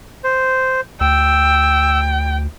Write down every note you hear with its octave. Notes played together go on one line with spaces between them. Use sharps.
C5
D2 G5 E6